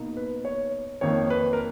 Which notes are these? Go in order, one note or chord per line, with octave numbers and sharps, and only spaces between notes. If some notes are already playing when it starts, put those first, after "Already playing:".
Already playing: B2 A#3 D#4
B4
C#5
F2 D#3 A#3 D#4 C#5
B4
A#4